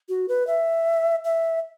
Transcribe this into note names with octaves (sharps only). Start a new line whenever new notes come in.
F#4
B4
E5
E5